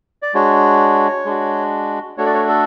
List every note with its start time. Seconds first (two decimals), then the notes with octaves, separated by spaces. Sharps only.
0.22 D5
0.34 G#3 D4 F#4 C#5
1.25 G#3 D4 F#4
2.18 A3 D4 F#4 C#5
2.26 D5
2.34 C#5
2.49 A4